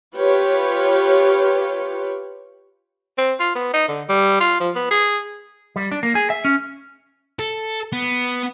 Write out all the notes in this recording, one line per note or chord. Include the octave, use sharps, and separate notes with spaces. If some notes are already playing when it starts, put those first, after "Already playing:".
F4 G4 B4 C#5
C4
F4
B3
D#4
D3
G3
F4
F3
B3
G#4
G3
D4
A#3
G#4
E5
C#4
A4
B3